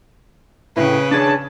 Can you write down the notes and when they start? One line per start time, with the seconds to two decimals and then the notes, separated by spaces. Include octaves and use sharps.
0.76 A2 C#3 B4
1.11 D4 G#4 C#5 A5